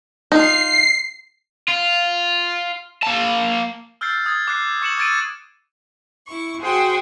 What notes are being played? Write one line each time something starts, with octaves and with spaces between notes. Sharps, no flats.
D#4 F4 C7
F4
A#3 A5
E6 F6 G6 A6 C7
D#6 G#6 A6
D6 F#6 C7
C#6 C#7 E7 F#7
D6 E6 G#6 A6 D7 D#7
E4 C#6
F#4 G#4 C5 F#5 G5